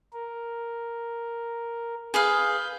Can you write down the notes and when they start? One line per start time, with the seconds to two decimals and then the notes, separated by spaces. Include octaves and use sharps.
0.13 A#4
2.14 G#4 B4 F5 G6